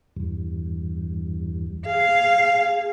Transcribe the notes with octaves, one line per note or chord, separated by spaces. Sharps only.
E2 G2
G#4 F5